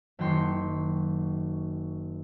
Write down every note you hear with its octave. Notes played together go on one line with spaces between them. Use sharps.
F#1 D#3 F#3 G5 C6 C#6